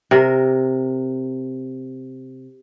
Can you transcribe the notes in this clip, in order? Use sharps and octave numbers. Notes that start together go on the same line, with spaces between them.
C3 A#4